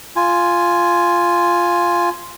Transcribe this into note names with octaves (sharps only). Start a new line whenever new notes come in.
F4 G#5